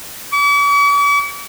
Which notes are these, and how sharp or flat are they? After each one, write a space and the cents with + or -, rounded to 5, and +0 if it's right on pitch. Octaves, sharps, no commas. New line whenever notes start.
D6 -45